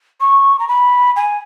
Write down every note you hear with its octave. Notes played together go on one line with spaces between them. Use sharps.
C#6
A#5
B5
G#5